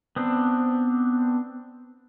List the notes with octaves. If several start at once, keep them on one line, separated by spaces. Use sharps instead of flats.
B3 C4 D4